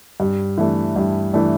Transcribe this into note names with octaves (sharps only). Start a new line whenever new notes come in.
G2
E3 A3 D4
G2
E3 A3 D4